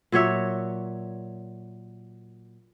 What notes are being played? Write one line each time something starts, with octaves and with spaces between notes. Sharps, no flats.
A#2 F#3 C#5 E5